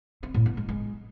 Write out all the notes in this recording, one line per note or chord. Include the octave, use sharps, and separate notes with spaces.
C4
A2
B3
G#3
G#3